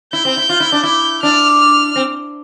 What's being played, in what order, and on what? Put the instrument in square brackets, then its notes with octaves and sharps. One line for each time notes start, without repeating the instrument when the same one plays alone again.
[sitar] E4 [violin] G6
[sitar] C4
E4
F4
E4
D4
[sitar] E4 [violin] G6
[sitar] D4 [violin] F6
[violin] F6
[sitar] C4